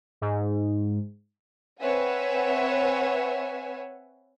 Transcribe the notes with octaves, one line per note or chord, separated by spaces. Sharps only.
G#2
C4 B4 C#5 E5 F#5 G#5